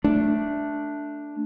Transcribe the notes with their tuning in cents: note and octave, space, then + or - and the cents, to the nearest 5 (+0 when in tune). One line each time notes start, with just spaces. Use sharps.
A3 +0 D4 +0